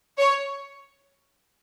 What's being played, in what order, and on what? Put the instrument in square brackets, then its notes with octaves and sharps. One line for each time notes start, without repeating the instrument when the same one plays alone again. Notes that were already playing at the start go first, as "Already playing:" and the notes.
[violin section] C#5